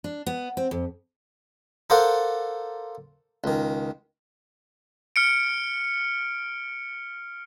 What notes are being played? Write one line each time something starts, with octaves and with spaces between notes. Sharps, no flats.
D4
B3
C4
F2
A4 A#4 C5 D5 F5 F#5
C#2 D#3
F6 C#7 D7